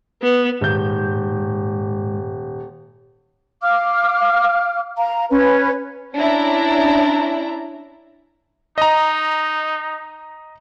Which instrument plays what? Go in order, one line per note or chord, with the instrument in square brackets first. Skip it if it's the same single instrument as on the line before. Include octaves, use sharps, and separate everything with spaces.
[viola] B3
[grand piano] D#1 G6 [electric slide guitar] G#2
[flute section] F5 D6 F6
F5 A#5
C#4 B4
[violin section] C#4 D4 E4 A#5
[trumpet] D#4 [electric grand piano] D#5 A#5